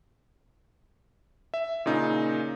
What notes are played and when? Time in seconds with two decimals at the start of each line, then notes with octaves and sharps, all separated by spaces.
1.54 E5
1.86 A#2 C#3 D#4